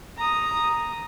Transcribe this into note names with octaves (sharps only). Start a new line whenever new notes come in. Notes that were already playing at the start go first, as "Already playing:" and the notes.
A#5 D#6